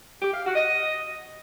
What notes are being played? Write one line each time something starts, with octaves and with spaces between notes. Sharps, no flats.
G4
F5
F#4
D#5